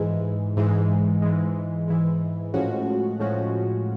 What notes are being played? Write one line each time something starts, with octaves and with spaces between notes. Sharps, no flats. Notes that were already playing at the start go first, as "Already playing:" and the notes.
Already playing: G#2 E3 G#3
G#2 E3 G#3
G#2 E3 G#3
G#2 E3 G#3
A2 F3 G#3 C#4 F#4
A2 F3 G#3 C#4 F#4